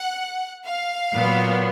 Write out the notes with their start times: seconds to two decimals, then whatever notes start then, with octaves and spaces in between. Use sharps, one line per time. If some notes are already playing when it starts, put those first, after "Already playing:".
Already playing: F#5
0.66 F5
1.16 A#2 F#3 B3